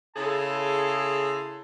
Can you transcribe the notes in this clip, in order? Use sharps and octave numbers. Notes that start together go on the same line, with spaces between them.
C#3 E4 G#4 A4 A#5 C6